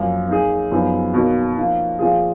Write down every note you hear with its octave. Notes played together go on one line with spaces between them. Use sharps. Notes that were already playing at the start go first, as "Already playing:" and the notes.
Already playing: F#2 F3 A#3
A#3 D#4 G#4
F#2 F3 B3 D#4 G#4
B2 F#3 A#3 D#4 A#4
F3 A#3 D#4
A#2 F3 A#3 F4 G#4